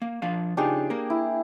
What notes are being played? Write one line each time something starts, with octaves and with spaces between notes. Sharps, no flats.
A#3
F3 D4 F5
C#3 D4 D#4 F4 G4 G#4
A#3 A#4
E4